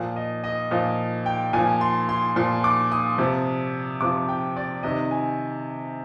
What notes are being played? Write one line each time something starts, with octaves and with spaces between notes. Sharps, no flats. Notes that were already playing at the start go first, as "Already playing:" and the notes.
Already playing: A#2 F3
D#5
D#5
A#2 F3 D#5
G5
A#2 F3 G#5
C6
C6
A#2 F3 C6
D6
D#6
C3 F3
C3 F3 D6
G5
D5
C3 D#3 D#5
G#5